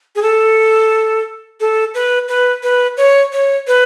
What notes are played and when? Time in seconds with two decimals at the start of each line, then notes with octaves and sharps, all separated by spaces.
0.15 G#4
0.22 A4
1.60 A4
1.94 B4
2.28 B4
2.63 B4
2.97 C#5
3.32 C#5
3.67 B4